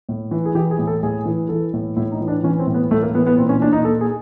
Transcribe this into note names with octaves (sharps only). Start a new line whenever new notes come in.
A2
E3
G#4
E3 G4
G#4
A2
A4
A2 G#4
E3
E3 A4
A2
A2 E4
D#4
E3
D4
E3 C#4
C4
A2
B3
A2 A3
A#3
E3 B3
B3
A#2 C4
C#4
A#2 D4
D#4
A#2 A4
G#4